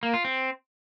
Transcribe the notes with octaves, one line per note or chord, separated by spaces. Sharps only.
A#3
F4
C4